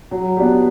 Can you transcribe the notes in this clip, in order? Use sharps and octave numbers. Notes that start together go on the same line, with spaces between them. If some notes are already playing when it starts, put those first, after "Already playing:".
F#3
B3 D4 G4